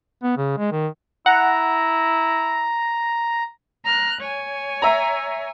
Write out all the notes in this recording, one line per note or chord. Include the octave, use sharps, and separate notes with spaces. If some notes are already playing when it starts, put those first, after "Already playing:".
B3
C#3
G#3
D#3
E4 F#5 A#5
A#5 F6 F#6
C#5 G#5
E5 A#5